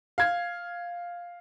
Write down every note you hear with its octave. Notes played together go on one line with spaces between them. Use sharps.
F5 G#6